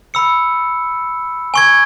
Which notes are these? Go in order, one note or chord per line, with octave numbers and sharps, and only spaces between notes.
B5 E6 C#7
G#5 C#6 G#6